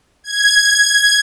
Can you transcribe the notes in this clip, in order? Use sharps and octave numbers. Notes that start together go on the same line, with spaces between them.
G#6